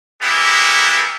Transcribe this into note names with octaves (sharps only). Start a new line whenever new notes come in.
G3 G#3 A#3 B3 E4 G4